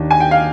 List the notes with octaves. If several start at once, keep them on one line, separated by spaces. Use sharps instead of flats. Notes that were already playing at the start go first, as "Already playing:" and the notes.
Already playing: D#2 D#3 A#3 D4
G#5
G5
F5